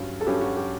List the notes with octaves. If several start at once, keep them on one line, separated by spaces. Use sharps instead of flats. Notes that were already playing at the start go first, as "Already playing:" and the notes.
Already playing: G2 F#3 C#4
A4
G2 F#3 C#4 G4
F#4
G4